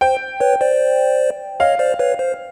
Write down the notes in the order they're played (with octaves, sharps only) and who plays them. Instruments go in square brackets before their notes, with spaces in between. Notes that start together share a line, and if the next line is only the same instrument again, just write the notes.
[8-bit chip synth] C5 [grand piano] G5
[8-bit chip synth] B4 C#5
C5 D5
[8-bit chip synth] C#5 D#5 [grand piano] F5
[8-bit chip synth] C5 D5
B4 C#5
C5